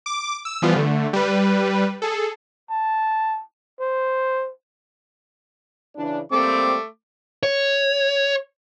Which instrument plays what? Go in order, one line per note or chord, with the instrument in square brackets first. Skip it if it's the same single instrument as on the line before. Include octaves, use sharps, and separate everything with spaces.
[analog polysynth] D6
E6
E3 F3 G3 B3 F4
D3 A3
G3 B4
G#4 A4
[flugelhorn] A5
C5
[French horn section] C#3 E3 D4
[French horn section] G3 A#3 C4 [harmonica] A3 D6
[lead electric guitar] C#5